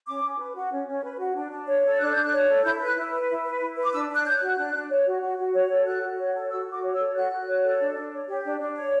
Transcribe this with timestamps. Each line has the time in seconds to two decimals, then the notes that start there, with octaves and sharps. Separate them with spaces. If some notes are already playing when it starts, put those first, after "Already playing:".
0.06 C#4 D6
0.23 C#4
0.39 B4
0.55 F#4
0.71 C#4
0.87 C#4
1.03 B4
1.19 F#4
1.35 D4
1.52 D4
1.68 C#5
1.84 A4
2.00 D4 F#6
2.12 D4 G6
2.24 F#6
2.32 C#5
2.48 A4
2.64 E4 G6
2.80 B4
2.86 F#6
2.97 E4
3.13 B4
3.29 E4
3.45 B4
3.61 E4
3.77 B4
3.82 D6
3.93 D4 E6
4.09 D4
4.14 F#6
4.25 C#5 G6
4.36 F#6
4.41 F#4
4.58 D4
4.74 D4
4.90 C#5
5.06 F#4
5.22 F#4
5.38 F#4
5.54 C#5
5.70 A4
5.86 F#4 F#6
6.02 F#4
6.19 C#5
6.35 A4
6.51 F#4 E6
6.67 F#4
6.72 D6
6.83 C#5
6.94 E6
6.99 A4
7.15 F#4 F#6
7.31 F#4
7.47 C#5
7.63 A4
7.79 D4
7.95 D4
8.12 C#5
8.27 G4
8.44 D4
8.60 D4
8.76 C#5